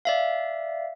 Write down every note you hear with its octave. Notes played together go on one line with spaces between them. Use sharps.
D5 E5 F5